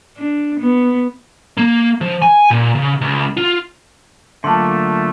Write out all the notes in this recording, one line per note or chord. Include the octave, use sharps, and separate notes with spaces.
D4
B3
A#3
F3
G#5
A#2
C#3
C#2
F4
D3 F#3 A3 A#3 F4 A5 C6